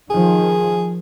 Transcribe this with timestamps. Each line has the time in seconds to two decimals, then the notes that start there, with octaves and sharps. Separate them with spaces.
0.10 D#3 F3 G#4